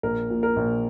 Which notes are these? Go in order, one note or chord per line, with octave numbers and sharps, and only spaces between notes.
A#1 A#4
A#2
A#4
A#1